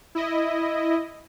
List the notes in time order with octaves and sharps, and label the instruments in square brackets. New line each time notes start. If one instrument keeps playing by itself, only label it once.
[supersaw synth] E4 D#5